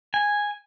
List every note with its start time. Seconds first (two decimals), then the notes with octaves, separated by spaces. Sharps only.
0.14 G#5